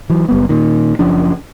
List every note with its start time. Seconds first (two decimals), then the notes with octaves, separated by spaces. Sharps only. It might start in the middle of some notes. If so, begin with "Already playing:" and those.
0.10 E3 F#3
0.29 F#1 G3 B3
0.49 A#2 D#3
0.99 F#1 F3 C#4 D4